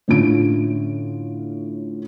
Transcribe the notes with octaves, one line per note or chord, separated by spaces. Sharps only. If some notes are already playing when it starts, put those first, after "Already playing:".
A2 D3 C#4 F4 D7